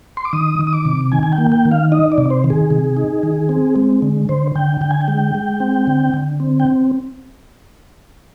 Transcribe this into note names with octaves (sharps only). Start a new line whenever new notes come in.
C6
D6
D#3 D#6
D#3
D#6
D6
C3
D#3 G#5
G#5
G5
A#3
G5
D#3
F5
D#4 D#5
D5
C3
C5
D#3
G#4
C3
D#4
D#3
C4
G#3
D3
D3 C5
D3 G5
D3 G5
G#5
G5
G#3
G#3
C4
D3
D3
C4
G5